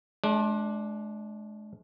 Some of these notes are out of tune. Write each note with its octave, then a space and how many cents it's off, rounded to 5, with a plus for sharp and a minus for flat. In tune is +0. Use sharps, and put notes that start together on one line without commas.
G#3 +40 D4 +0